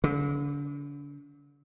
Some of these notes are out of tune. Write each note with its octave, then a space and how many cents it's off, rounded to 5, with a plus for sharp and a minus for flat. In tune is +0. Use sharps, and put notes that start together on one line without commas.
D3 -40